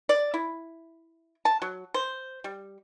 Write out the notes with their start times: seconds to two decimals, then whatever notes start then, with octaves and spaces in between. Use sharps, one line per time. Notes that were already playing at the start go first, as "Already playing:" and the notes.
0.09 D5
0.34 E4
1.45 A5
1.62 F#3
1.94 C5
2.44 G3